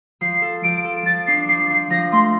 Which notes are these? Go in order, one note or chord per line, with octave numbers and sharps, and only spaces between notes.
F3 C7
A4
F3 D7
A4
F3 A6
D4 C7
F3 C7
F3 C7
F3 A#6
A3 C6